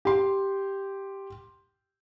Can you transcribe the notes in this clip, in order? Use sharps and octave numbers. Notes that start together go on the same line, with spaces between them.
G4 C6